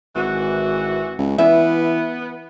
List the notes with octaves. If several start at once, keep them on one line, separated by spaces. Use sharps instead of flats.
G#1 E3 F#4
C#2
E3 B3 E5